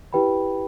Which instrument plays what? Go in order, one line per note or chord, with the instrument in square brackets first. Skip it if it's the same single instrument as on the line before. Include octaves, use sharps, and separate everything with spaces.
[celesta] E4 G4 B4 G5 B5